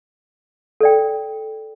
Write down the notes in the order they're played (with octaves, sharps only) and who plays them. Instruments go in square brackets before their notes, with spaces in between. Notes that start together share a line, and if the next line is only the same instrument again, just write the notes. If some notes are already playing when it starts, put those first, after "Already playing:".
[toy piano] A4 D5 G5